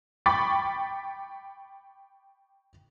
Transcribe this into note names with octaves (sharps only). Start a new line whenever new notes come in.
G5 B5 C#6 D6 A6 B6